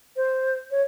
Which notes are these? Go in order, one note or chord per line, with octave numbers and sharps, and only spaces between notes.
C5
C#5